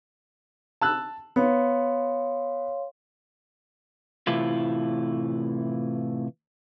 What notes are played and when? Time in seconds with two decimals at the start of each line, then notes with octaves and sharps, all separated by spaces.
0.81 A5 E6 F#6
1.36 B3 C#5 F5 C6
4.27 A2 C3 E3 E4 F4